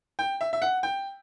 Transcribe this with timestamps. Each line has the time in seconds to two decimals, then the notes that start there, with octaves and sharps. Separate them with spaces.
0.19 G5
0.41 E5
0.53 E5
0.62 F#5
0.83 G5